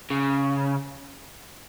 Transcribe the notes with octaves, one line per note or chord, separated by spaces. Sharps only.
C#3